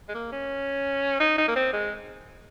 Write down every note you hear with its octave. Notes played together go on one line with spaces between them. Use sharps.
G#3
A#3
C#4
D#4
D#4
A#3
C4
G#3